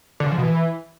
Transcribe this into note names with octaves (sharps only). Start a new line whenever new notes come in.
D3
C#3
F3
B2
E3